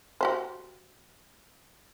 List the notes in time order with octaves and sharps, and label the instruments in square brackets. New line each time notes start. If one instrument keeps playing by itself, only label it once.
[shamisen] F#4 G4 C5